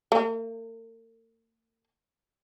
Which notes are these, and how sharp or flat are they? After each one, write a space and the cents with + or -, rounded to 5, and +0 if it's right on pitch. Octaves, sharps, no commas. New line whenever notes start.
A#3 -45